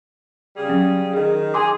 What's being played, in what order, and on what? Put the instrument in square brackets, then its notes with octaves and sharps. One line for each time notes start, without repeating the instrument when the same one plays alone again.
[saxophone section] C#3 G3 G#4
[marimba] F#3 C#4
[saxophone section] D#3 [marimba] G#4
[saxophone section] G#4 [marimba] G#5 C6 D6